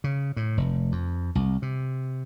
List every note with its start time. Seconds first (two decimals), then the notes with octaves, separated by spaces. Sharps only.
0.04 C#3
0.36 A2
0.57 F1
0.92 F2
1.35 C2
1.62 C3